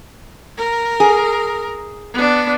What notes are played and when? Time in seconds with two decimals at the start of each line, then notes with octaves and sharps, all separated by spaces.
0.58 A#4
1.00 G#4
2.14 B3 D4